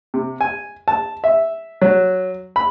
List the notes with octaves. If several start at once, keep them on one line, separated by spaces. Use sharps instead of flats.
C3
G#5
A5
E5
F#3
B5